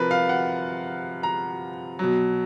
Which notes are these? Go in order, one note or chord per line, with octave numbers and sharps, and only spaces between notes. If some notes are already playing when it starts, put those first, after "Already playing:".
Already playing: C3 F3 A#4 B4
F5
F#5
A#5
B2 F#3